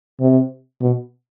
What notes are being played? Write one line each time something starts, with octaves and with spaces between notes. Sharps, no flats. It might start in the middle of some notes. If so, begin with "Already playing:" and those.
C3
B2